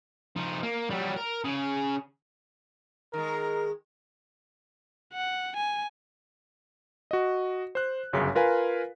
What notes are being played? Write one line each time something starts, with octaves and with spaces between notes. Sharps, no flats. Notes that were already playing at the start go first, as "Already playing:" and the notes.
F3 D#4
A#3
F#3 G3
A#4
C#3 G#4
D#3 G#3 A#4
F#5
G#5
F#4 D#5
C5 F#6
G1 F#2 C#3 B6
F4 A#4 B4 F5 G#5